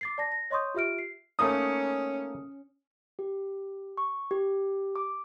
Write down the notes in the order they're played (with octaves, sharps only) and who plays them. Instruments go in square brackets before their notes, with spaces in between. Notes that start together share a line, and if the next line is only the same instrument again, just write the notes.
[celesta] D6 A6 C7
D5 A5 A#6
A#6
C#5 D#5 C6 C#6 D#6 G6
F4 G4 E5 F6 D7
C7
[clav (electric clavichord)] A3 A#3 D#4 [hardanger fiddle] C#4 [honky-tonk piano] D#6
[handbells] G4
C#6
G4
D6